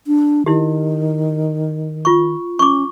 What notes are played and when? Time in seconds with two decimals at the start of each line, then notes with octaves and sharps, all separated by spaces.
0.07 D4
0.46 D#3 E4 G4
2.05 F4 C#6
2.59 C#4 C#6 D6